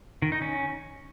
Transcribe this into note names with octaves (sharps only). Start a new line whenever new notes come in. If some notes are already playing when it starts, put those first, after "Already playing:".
D#3
D#4
C#4